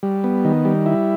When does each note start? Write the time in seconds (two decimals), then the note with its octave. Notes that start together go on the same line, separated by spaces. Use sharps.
0.03 G3
0.24 B3
0.45 D#3
0.65 G3
0.86 E4